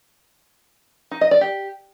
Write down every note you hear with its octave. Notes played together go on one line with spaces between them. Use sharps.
D#4
D#5
D5
G4